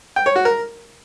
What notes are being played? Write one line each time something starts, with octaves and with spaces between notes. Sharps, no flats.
G5
C#5
F#4
A#4